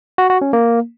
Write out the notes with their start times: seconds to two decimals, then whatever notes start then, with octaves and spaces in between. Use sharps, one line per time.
0.18 F#4
0.30 F#4
0.41 C#4
0.53 A#3